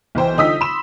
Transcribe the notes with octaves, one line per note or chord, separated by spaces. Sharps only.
B1 E3 C5 G5
D3 D#4 F4 D#6 E6 B6
B5 C6 E7